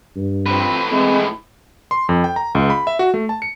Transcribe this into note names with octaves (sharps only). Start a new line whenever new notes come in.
G2
A2 F3 C4 B4
E3 G#3 C4
C6
F2
G5
A#5
C#2
B5
E5
F#4
A3
A5
C#7